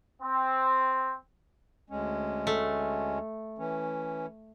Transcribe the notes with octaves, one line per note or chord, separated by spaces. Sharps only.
C4
D2 G#3 C#4
A3
E3 C#4